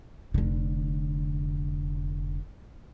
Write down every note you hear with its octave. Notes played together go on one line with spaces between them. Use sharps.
F1 D3